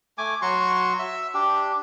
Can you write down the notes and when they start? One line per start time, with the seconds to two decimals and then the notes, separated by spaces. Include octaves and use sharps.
0.18 A3 G#5 D6
0.42 F#3 F#4 C6 C#6
0.99 E5 E6
1.34 D4 G4